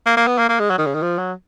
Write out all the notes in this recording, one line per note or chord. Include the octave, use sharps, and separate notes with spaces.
A#3
A#3
B3
A#3
A#3
G#3
F#3
D#3
C#3
D#3
F3
F#3